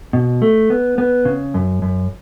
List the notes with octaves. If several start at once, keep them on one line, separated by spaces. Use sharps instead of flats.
B2
A3
B3
B3
C#3
F#2
F#2